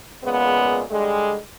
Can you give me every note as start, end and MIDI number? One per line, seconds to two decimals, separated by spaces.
0.23 0.82 46
0.23 0.82 49
0.23 0.82 56
0.23 0.82 59
0.90 1.36 50
0.90 1.36 55
0.90 1.36 56